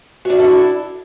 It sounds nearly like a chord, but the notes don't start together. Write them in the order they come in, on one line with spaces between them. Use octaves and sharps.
F#4 D4 E5 A4 E4